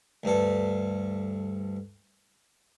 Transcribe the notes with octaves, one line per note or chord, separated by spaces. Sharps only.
D2 G2 A4